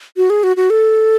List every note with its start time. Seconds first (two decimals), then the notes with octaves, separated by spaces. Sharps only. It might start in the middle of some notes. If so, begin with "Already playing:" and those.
0.17 F#4
0.30 G#4
0.43 F#4
0.56 F#4
0.70 A4